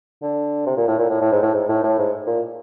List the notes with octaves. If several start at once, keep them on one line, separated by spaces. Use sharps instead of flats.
D3
C3
A#2
A2
A#2
A2
A2
G#2
A2
G#2
A2
A2
G#2
A#2